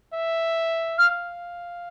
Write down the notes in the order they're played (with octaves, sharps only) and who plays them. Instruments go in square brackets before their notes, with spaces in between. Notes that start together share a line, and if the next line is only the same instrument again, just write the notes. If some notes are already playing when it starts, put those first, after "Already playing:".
[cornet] E5
[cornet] F5 [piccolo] F6